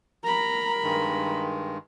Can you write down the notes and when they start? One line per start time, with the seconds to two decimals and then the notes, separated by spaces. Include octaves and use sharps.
0.24 A#4 A#5 B5
0.83 G2 D#3 G#3